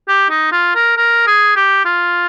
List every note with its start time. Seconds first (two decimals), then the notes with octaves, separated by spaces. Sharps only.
0.08 G4
0.30 D#4
0.52 F4
0.75 A#4
0.97 A#4
1.27 G#4
1.56 G4
1.85 F4